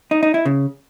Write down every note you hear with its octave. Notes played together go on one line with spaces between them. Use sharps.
D#4
D#4
E4
C#3